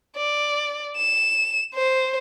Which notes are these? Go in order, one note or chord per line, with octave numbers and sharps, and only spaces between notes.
D5
E7
C5